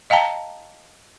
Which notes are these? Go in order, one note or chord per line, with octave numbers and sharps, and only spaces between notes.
D#5 F5 G5 A5 A#5